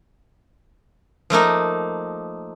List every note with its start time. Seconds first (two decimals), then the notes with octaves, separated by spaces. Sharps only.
1.30 F3 A3 A#3 D#4